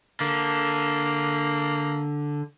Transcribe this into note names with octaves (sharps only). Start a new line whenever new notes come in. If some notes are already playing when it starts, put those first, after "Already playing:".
D3 A#3